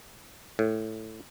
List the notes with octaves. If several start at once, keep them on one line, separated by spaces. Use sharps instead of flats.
A2